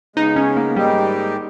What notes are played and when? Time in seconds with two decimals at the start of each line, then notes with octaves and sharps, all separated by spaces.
0.16 C#3 G#3 B3 D#4
0.36 C#4
0.56 A#3
0.76 G#2 D#3 G3 G#3 D#4 G4